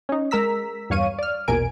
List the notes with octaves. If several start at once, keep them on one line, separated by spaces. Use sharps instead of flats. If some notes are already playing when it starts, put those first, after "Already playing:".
C#4 D#4
G#3 A#4 A#5 E6 B6
E2 G2 C#5 F5 C#6 D#7
D5 F6
A#1 E2 B2 A#4 G#5 D7